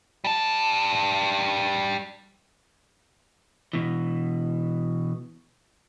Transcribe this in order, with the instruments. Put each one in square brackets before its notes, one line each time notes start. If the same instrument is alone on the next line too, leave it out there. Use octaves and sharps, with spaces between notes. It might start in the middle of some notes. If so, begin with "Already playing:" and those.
[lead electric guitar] G3 A5
B2 E3